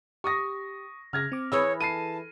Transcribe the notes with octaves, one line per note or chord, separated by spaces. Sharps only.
G4 C#6 D#6 A#6
C#3 G#4 F6 G#6 A#6
C4 D6
E3 G#4 B4 C#5 E6
A4 A5 C7 D#7